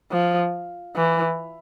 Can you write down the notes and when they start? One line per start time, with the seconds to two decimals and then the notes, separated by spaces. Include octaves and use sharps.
0.12 F3
0.96 E3